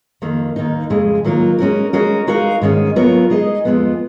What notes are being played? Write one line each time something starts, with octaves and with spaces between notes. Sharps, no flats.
F2 D#3 A#3
D#2 D#3 A#3 D#4
F2 C#3 G#3
D#3 F#3 A#3 F4 A#4
G#3 C#4 F#4 A#4
G#3 C#4 F#4 A#4
G#3 D#4 F#4 A#4 F5
G#2 D#3 G#3 C#4
F#3 B3 F4 A#4 C#5
G#3 D#4 G#4 D#5
F2 F3 G#3 B3 F4